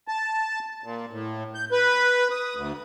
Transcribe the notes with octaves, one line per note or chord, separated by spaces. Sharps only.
A5
A#2
A2
G6
B4
D#6
D2